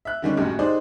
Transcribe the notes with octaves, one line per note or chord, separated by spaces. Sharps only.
E5 F#6
D3 D#3 G3 G#3 C#4 D4
F#1 F#2 A2 F#3 G4
G#3 D#4 G4 G#4 C5 D5